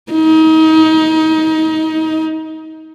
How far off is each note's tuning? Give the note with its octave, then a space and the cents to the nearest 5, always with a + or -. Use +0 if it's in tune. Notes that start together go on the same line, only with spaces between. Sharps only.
D#4 +30